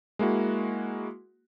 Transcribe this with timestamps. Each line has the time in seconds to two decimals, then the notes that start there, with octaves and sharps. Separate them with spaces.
0.19 G#3 A#3 E4 F#4